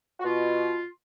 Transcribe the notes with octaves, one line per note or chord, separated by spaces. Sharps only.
F#4
B2 F4